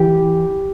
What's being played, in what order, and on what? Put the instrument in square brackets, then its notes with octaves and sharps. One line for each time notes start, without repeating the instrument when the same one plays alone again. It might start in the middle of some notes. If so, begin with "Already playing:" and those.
Already playing: [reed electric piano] E3 G4